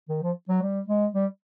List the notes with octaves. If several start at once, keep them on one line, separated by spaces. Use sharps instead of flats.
D#3
F3
F#3
G3
G#3
G3